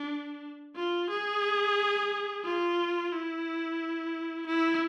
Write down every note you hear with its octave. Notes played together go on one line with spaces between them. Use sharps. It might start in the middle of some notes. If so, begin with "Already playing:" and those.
Already playing: D4
F4
G#4
F4
E4
E4